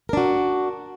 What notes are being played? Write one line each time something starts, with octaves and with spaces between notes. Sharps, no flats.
D4 F#4 A#4